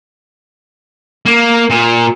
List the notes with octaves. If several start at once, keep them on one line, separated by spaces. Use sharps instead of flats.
A#3
A#2